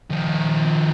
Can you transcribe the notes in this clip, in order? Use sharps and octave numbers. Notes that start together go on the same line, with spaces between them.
D#3 F3